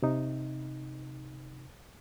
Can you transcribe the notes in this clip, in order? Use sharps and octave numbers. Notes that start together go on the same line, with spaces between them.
C3 D#4